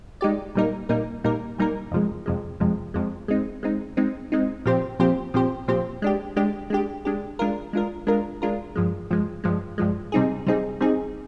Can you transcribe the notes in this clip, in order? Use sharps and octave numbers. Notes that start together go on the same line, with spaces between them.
G#3 D#4 G4 D5
A#2 G3 A#3 D#4 A#4
A#2 G3 A#3 D#4 A#4
A#2 G3 A#3 D#4 A#4
A#2 G3 A#3 D#4 A#4
F2 C3 F3 G#3
F2 C3 F3 G#3
F2 C3 F3 G#3
F2 C3 F3 G#3
G#3 C4 D#4
G#3 C4 D#4
G#3 C4 D#4
G#3 C4 D#4
A#2 F3 C4 G4 C5
A#2 F3 C4 G4 C5
A#2 F3 C4 G4 C5
A#2 F3 C4 G4 C5
G#3 D4 G4
G#3 D4 G4
G#3 D4 G4
G#3 D4 G4
G#3 D4 F4 A#4
G#3 D4 F4 A#4
G#3 D4 F4 A#4
G#3 D4 F4 A#4
G2 F3 G#3
G2 F3 G#3
G2 F3 G#3
G2 F3 G#3
C3 G3 C4 D#4 G#4
C3 G3 C4 D#4 G#4
C3 G3 C4 D#4 G#4